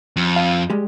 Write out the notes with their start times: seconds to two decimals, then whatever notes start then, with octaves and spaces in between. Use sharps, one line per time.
0.16 F2
0.36 F5
0.70 G3 G#3 G4